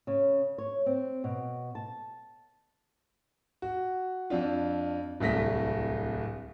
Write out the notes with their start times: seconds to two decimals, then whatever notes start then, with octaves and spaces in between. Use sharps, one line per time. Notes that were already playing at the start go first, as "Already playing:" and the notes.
0.07 C#3
0.58 C#5
0.86 C4
1.24 B2
1.75 A5
3.62 F#4
4.30 F2 D4 F4
5.20 D1 C2 A3 A#6 B6